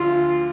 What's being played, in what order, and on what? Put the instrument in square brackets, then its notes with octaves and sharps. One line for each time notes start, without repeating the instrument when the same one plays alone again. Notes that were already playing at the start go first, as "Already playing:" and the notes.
Already playing: [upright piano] D2 D3 F3 [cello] F4